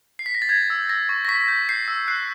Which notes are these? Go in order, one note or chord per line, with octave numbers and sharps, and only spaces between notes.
C7
B6
A#6
A6
G6 G#6
E6
E6 A#6
C#6
A#6
C#6 B6
G6
G6 C7
E6
F#6 C7